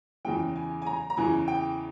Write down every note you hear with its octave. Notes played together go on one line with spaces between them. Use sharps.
E2 C#3 E3 G5
G#5
G#5
A#5
A#5
E2 C#3 E3 G#5
G5